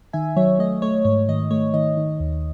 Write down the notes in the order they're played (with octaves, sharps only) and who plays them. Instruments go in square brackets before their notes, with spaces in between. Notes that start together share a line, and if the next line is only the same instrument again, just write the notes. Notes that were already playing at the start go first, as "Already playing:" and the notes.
[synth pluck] D#3 E5 G#5
F#3 C#5 E5
A3 D#5
A3 C#5
G#2 C#5
D#3 D#5
A3 C#5
D#3 D#5
D#3
D#2